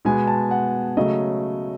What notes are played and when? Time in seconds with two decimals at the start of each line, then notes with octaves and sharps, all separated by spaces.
0.05 B2 G#3 B3 G#5
0.27 A5
0.51 F#5
0.97 C#3 F#3 A3 D#5